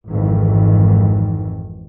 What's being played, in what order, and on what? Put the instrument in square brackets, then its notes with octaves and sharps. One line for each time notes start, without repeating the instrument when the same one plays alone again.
[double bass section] G#1 F2 G#2 D#3 E3